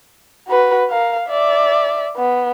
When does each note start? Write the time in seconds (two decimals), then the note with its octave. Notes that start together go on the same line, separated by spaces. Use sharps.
0.48 F#4 B4
0.90 A#4 F5
1.28 D5 E5
2.16 B3